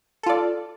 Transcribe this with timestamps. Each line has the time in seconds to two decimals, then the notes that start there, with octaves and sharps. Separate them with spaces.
0.23 A4
0.26 F4
0.29 D5